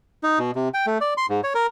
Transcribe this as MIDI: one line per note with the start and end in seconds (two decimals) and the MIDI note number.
0.23 0.39 63
0.39 0.51 47
0.56 0.69 48
0.74 0.86 79
0.87 0.98 57
1.01 1.14 74
1.17 1.26 84
1.29 1.41 44
1.44 1.53 73
1.55 1.67 70